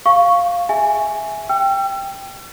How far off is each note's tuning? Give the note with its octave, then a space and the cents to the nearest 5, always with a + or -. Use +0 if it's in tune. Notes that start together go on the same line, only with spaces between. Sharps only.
F5 +0 C#6 +5
G#4 +0 E5 +0 G#5 +0
G5 +5 E6 +40